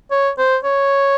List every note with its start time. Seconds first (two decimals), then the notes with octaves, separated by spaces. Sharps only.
0.11 C#5
0.38 C5
0.65 C#5